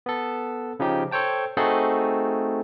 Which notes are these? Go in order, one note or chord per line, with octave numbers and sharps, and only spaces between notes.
B3 A4
C#3 F3 D#4 G4
A4 C5 C#5 G5 A5
A3 C4 D#4 F#4 G#4 A4